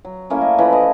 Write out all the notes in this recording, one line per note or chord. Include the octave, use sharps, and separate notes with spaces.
F#3
A3 A#3 C#4 E4
D#5
E3 F3 D5 B5
D#5